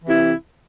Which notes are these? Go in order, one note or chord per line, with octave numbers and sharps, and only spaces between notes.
C3 E3 E4